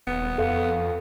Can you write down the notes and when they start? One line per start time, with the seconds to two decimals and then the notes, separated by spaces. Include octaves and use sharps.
0.07 D#1 B3
0.38 F2 A4 F5